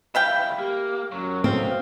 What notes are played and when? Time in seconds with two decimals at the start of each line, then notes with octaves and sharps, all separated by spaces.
0.15 G3 E4 E5 F5 G5
0.59 A#3 G4
1.12 F#2 F#3
1.44 C4 D#5 F5